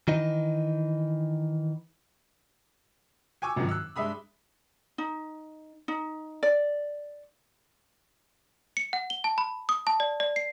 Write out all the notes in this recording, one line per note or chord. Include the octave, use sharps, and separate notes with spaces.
D#3 E3 D#4
G5 G#5 C#6 D6 E6
G#1 F#2 D#3 F3 F#3
E6 F#6
G2 G#3 E5 B5 D#6
D#4
D#4
D5
C#7
F#5
G7
A5
B5
D#6
A5
D5
D5
C7